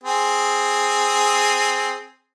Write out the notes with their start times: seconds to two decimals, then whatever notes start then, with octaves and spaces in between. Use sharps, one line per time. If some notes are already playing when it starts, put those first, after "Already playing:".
0.04 C4 G#4